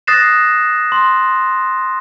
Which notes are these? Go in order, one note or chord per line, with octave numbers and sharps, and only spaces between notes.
D#6 F#6 A6 A#6 C7 E7
C6